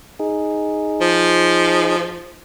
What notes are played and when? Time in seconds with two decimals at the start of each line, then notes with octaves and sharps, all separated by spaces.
0.20 D#4 G#4
1.01 F3